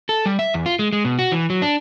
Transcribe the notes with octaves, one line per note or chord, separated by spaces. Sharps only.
A4
G3
E5
E2
F4
G#3
G#3
B2
F#4
E3
F#3
D4